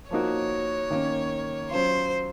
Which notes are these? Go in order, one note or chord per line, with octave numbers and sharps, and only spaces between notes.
F3 A#3 D#4 F#4 C#5
D#3 A#3 C#4
F#3 C#4 F4 C5